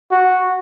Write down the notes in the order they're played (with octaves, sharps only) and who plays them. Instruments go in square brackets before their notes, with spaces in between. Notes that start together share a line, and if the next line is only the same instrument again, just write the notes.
[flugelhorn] F#4